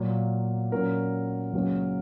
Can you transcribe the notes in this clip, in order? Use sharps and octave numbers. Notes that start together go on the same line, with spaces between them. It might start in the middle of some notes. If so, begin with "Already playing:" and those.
Already playing: A#2 F#3 A#3
A#2 F#3 C#4 A#4
C#2 C#3 F#3 A#3 C#4